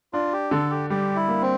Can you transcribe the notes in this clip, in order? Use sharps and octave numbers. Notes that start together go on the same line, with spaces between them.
D4 F4
G4
D3 A4
G4
G3 G4
E4
A#3
C4